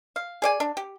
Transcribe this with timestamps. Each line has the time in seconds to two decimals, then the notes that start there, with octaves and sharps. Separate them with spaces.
0.16 F5
0.42 G#4 D5 G#5
0.60 D4
0.77 G4